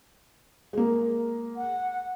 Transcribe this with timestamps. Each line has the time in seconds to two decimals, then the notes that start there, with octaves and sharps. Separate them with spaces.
0.73 G#3 A#3
1.57 F#5